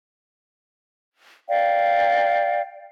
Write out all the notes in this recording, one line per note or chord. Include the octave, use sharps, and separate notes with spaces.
D5 F5 G5